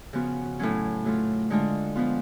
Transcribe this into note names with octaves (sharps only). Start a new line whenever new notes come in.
C#3 F3 B3 F#4
A2 F#3 C#4
F#3 A3 F4
D3 G#3 D4 F4
F3 B3 F4